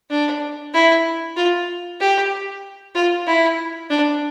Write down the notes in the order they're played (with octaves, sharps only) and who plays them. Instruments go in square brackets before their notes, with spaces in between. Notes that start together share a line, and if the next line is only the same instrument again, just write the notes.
[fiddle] D4
E4
F4
G4
F4
E4
D4